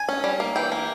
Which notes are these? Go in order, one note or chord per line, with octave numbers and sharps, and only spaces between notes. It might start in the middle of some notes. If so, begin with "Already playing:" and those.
Already playing: G#5
C#4
G3
A#3
E3 G5
A#3